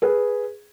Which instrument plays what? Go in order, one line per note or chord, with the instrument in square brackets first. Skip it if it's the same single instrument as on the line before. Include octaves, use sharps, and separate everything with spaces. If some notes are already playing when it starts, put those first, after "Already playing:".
[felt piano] G#4 B4